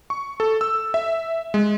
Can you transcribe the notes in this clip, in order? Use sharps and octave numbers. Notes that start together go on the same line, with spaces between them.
C#6
A4
E6
E5
G#3